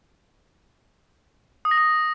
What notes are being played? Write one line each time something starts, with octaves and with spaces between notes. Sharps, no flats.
D#6
A#6
D#6